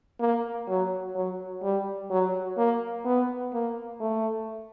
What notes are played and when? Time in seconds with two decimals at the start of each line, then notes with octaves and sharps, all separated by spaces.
0.20 A#3
0.68 F#3
1.15 F#3
1.63 G3
2.10 F#3
2.57 A#3
3.05 B3
3.53 A#3
4.00 A3